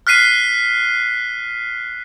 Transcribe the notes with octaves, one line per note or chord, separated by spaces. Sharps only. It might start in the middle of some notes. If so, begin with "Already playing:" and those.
F6 F#6 B6 C7 D#7